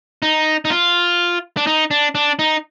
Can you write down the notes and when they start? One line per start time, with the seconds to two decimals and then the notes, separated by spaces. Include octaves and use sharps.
0.22 D#4
0.65 D#4
0.70 F4
1.57 D4
1.67 D#4
1.91 D4
2.15 D4
2.39 D#4